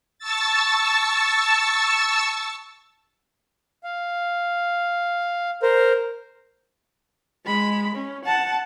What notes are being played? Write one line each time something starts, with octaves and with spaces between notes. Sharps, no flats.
A5 C#6 E6 A6
F5
A#4 C5
G#3 B5
C#4
F#5 A5